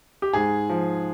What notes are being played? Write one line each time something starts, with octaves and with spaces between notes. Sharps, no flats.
G4
G#2 G#4
F3